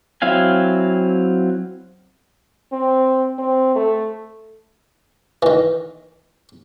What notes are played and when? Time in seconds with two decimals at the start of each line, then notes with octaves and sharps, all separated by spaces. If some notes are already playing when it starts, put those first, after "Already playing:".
0.22 F#3 C4 E4 F5 G#5
2.73 C4
3.39 C4
3.76 A3
5.42 D#3 E3